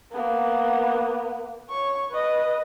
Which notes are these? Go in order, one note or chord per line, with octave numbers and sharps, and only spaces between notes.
A#3 B3
C#5 C#6
B4 D#5